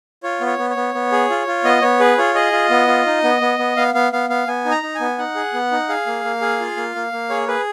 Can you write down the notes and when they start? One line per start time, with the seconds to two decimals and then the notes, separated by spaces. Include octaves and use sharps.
0.23 F4 C#5
0.41 B3
0.46 C#5
0.58 B3
0.70 C#5
0.77 B3
0.94 B3
1.12 G#4
1.30 F4
1.47 F4
1.64 B3 D#5
1.82 B3 C#5
2.00 G#4 B4
2.18 F4 C#5
2.35 G#4 D#5
2.52 F4
2.70 B3
2.88 F4
3.06 D#4
3.24 B3
3.41 B3
3.59 B3
3.77 B3 F5
3.94 B3 F5
4.12 B3 F5
4.30 B3 F5
4.47 B3 G#5
4.65 D#4
4.71 A#5
4.83 D#4
4.95 G#5
5.00 B3
5.18 D#4 F#5
5.35 G#4
5.54 B3
5.71 D#4
5.89 G#4 F5
6.06 A#3
6.24 A#3
6.41 G#4
6.60 F4
6.77 A#3
6.95 A#3
7.12 A#3
7.29 G#4 C#5
7.48 G#4 B4